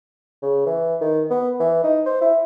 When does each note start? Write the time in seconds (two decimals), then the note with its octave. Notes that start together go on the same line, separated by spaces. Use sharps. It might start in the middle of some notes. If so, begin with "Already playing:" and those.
0.42 C#3
0.66 E3
1.01 D#3
1.30 B3
1.60 E3
1.84 D#4
2.06 C5
2.21 E4